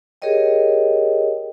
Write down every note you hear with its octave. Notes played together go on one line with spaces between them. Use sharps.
G4 G#4 A#4 C#5 D#5 G5